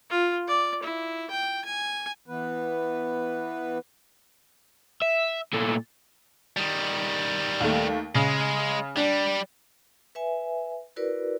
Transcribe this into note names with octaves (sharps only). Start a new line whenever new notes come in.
F4
D5
E4
G5
G#5
E3 B3 B4
E5
A#2 A3
D#3 G3
D#2 A3
C#3 G#3
G3 D4
B4 E5 G#5
E4 F#4 A#4 B4 D5